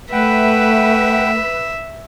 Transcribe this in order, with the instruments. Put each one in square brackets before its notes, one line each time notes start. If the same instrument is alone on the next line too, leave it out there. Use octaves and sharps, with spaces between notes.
[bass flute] A3 [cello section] B4 [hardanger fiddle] E5 [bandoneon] F#5 G5